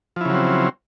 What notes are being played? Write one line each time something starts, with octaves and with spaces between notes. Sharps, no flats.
C#3 F3 F#3 C4 E4